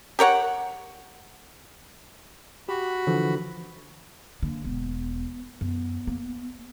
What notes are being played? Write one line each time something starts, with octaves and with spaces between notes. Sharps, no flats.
G4 A#4 C#5 F#5
F#4 G4 B5
D3 E3 F3
D3 A#3
E1 B3
F#2 B3
A#3